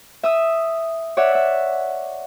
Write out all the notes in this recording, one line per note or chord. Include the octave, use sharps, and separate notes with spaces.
E5 D#6 E6
C#5 D5 E5 F#5
E5